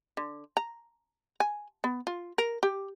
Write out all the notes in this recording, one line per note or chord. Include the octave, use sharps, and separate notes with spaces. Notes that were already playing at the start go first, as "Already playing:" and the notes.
D3
A#5
G#5
B3
F4
A#4
G4